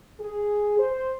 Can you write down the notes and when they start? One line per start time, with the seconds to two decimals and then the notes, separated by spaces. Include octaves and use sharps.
0.20 G#4
0.78 C5